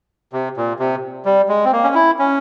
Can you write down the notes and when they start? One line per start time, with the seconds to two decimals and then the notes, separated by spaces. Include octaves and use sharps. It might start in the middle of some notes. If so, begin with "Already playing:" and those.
0.33 C3
0.57 A#2
0.79 C3
1.25 G3
1.49 G#3
1.65 C4
1.73 A#3
1.84 C#4
1.95 E4
2.19 C#4